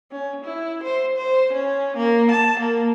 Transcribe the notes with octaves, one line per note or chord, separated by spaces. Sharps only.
C#4
E4
C5
C5
C#4
A#3
A5
A#3